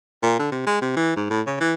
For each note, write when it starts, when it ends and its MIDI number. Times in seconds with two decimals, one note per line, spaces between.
0.23 0.34 46
0.39 0.49 50
0.52 0.65 48
0.66 0.80 56
0.81 0.95 48
0.96 1.15 52
1.16 1.29 44
1.30 1.41 45
1.47 1.60 49
1.60 1.74 52